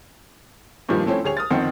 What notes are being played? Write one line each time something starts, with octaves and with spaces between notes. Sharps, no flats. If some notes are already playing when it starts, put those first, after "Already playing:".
G2 A#2 D#3 F3 G3
F3 A3 C4 C#4 E4
D2 G4 G#4 C#5 F7
D#6 F6 A6
G1 F2 D#3 C4 F#5